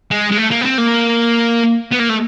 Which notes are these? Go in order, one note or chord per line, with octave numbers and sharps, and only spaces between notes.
G#3
G#3
A3
A#3
B3
C4
A#3
B3
A#3
A3